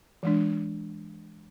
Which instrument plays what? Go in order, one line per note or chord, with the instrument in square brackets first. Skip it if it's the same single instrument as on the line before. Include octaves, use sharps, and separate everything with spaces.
[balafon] E3 G#3 D4